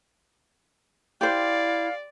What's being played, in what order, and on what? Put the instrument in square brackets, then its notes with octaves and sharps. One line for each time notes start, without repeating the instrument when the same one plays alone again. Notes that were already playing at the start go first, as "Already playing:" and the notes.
[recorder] E4 [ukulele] G4 C5 [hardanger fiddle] D5 [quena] F5